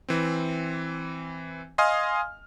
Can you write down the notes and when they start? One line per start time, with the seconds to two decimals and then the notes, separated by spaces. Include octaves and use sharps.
0.09 E3 C4
1.78 D#5 F5 G#5 C6 D#6 F6